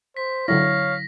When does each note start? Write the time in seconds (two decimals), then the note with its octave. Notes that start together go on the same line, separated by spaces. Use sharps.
0.17 C5 B6
0.48 D3 F#3 E4 C#5 F5 A#6